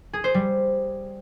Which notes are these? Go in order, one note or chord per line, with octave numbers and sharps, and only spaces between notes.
G#4
C5
G3